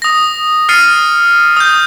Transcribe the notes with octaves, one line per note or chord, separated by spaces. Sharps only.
D#6 A#6
F6 A6 C7 C#7 D#7
D#6 G6